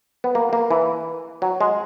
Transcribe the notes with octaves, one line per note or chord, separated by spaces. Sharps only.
B3
A#3
A#3
E3
F#3
G#3